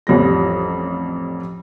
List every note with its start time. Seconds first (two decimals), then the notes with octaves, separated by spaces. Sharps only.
0.07 A1 F2 G3 A#6